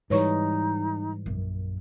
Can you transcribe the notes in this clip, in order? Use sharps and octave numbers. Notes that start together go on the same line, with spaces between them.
G#2 E3 G3 D#4 B4 C#5 C#6
A#1 F#2